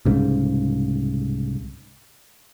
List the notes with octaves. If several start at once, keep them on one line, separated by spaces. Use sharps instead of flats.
C2 G#2 C#3